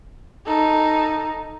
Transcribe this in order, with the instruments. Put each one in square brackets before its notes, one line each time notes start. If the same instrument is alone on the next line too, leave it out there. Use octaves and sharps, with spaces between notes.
[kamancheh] D#4 A4